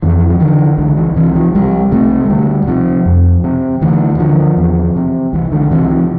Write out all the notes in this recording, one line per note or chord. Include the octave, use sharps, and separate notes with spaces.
F2 E3
F3
D3 E3
C2 D3
E3
C3 E3
F3
C2 G3
C3 A3
A3
D2 G3
C3 F3
F2
C3
D2 E3
D3 F3
E2
C3
C2 E3
D3
C3 E3
F3